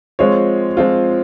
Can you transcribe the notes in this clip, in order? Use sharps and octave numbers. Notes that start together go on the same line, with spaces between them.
F3 G#3 C4 F4 C#5
F3 G#3 C4 F4